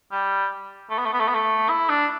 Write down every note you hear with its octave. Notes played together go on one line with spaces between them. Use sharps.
G3
A3
B3
A3
B3
A3
B3
A3
E4
D4